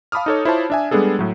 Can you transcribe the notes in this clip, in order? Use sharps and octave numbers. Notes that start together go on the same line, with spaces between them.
F5 A5 B5 D6 D#6 F6
D#4 A4 C#5
E4 F4 C5 C#5 A5
D4 E5 G#5
G3 G#3 B3 D4 G#4 A4
A2 F#3